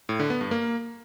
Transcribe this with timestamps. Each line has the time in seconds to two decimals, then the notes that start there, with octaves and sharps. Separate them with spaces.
0.09 A2
0.19 D3
0.30 B3
0.41 G2
0.51 A#3